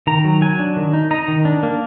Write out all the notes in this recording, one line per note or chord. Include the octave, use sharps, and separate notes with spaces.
D#3 A#5
F#3
F#3 G#5
D4
D#3
D#4
D#4 A#5
D#3
D4
A#3